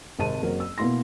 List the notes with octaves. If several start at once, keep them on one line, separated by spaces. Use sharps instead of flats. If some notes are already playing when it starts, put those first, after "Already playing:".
G#1 C3 A5 D#7
F#1 F#3 C4 A#4
E6
B2 A#3 B3 E4 C6 A#6